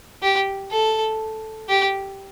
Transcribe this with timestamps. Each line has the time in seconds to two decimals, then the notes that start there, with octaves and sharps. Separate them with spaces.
0.23 G4
0.71 A4
1.69 G4